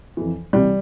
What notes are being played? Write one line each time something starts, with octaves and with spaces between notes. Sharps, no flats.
F2 E3
C2 C3 E3 G3